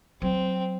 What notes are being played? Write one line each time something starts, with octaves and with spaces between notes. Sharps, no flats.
F#3 C4